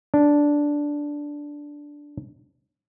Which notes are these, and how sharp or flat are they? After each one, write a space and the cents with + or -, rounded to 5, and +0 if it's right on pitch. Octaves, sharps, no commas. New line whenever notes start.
D4 -5